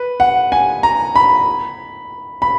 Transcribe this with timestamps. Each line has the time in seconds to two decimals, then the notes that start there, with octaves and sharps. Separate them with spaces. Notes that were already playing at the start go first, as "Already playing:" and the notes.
Already playing: B4
0.20 F#5
0.52 G#5
0.83 A#5
1.15 B5
2.42 B5